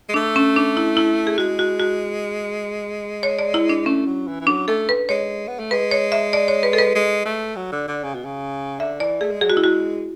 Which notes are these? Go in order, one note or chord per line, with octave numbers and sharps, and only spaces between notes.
G#3
A3 D4
C#4
D4
E4
E4
G#4
G#3 F#4
F#4
F#4
C#5
D5
E4
D4
A3 C#4
F#3
E3
E3
F#3 D4
A3 A4
B4
G#3 C#5
B3
A3
G#3 B4
C#5
E5
D5
C#5
B4
A4
B4
G#3
A3
F#3
D3
D3
C#3
B2
C#3
D3 E5
E3 D5
A3 G#4
G#3
F#3 G#4
G#3 F#4
E4
F#4